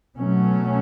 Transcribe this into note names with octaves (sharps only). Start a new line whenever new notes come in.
B2 F#3 A3 C#4